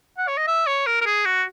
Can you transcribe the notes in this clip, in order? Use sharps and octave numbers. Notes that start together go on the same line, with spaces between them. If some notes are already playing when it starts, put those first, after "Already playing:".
F#5
C#5
D#5
E5
C#5
A#4
A#4
G#4
F#4